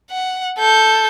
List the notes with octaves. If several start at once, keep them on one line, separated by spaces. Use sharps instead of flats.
F#5
A4 G6